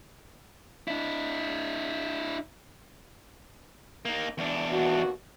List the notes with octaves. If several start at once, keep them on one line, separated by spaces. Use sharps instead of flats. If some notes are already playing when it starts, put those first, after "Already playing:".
D4 E4
A#3 D#4
E2 D4
D#2 B2 F#4